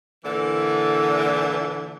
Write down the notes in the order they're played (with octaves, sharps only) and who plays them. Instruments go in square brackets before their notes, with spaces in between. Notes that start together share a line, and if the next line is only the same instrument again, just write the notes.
[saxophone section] A#2 D3 E3